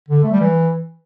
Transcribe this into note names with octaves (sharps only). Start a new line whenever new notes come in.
D3
A3
G3
E3